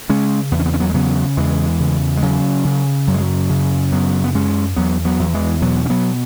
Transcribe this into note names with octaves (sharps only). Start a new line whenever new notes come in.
C#3 G#3 C#4
E2 B3
C#4
B3
C#4
F#3 B3
G#3
C#3 F#3 B3
E2 E3 G#3
C#3
G#3
C#3 F#3
C#3
F#2 F#3
G#3
F#3
C#3
F#2 F#3 B3
B3
F#2 G#3 C#4
E2 F#3 B3
F#3 B3
E2
E3 G#3
B2 F#3 B3
C#4
F#3 B3